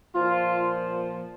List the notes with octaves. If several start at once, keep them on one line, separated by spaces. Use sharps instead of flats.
A#2 F3 F4